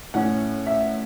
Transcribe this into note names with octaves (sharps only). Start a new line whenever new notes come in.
A2 E3 C#4 F#5
E5